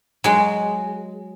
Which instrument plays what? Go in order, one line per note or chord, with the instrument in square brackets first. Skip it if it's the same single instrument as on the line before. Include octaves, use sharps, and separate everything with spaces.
[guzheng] F#3 G#3